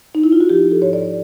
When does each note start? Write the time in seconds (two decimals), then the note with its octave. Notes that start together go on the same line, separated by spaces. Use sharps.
0.15 D#4
0.24 E4
0.32 F4
0.41 F#4
0.49 F3 G4
0.71 A4
0.82 G#2 C#5
0.93 D5